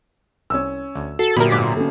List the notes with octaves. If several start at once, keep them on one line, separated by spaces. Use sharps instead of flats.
C2 C#4 E6
D2
F#4 A4 C7
G1 F#2 A#2 A#3 G4 A#4 B5
G#2 D6 B6
C#4 A4